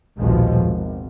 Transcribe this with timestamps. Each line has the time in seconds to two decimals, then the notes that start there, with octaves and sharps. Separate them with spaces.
0.19 A#1 D#2 B2 F3 G#3
0.62 G#1